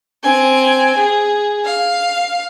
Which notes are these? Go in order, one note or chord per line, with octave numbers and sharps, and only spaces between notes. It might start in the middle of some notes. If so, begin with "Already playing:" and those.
C4 G#5
G#4
F5